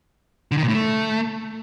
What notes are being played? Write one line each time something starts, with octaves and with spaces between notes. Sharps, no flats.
D3
D#3
A#2
A2
A3